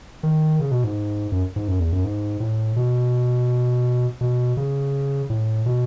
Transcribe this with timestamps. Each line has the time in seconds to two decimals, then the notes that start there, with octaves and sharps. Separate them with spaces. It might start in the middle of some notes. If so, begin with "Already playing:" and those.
0.23 D#3
0.59 C#3
0.71 B2
0.84 G#2
1.32 F#2
1.56 G#2
1.68 F#2
1.80 E2
1.92 F#2
2.04 G#2
2.40 A2
2.76 B2
4.21 B2
4.57 C#3
5.30 A2
5.66 B2